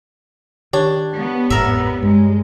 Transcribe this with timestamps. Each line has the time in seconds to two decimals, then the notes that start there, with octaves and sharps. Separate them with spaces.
0.73 D#3 D4 G4 C#5
1.16 B3
1.50 G#1 F2 A2 A#4 E5
2.03 G2 G#3